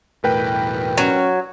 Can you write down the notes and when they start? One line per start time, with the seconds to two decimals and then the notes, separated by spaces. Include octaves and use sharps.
0.24 E1 A2 A#4 B4 G5
0.98 F#3 C#4